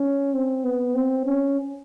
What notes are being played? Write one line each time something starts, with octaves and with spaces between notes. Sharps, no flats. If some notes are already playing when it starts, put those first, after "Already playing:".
Already playing: C#4
C4
B3
C4
C#4